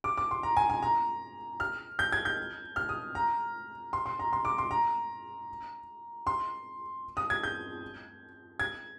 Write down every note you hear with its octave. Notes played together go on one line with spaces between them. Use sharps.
D6
D6
C6
A#5
G#5
G#5
A#5
F6
G6
G#6
G6
F6
D#6
A#5
C6
C6
A#5
C6
D6
C6
A#5
C6
D#6
G#6
G6
G#6